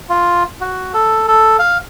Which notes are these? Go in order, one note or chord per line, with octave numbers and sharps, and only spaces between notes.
F4
F#4
A4
A4
F5